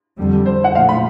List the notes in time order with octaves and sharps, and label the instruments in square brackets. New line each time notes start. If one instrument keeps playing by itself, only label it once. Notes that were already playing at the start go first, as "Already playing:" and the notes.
[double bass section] F2 D3 G3
[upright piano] C5
F#5
[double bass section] A#2 F3 A3 [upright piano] F5
[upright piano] B5